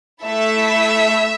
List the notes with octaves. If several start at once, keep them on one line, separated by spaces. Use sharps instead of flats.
A3 E4 A4 E5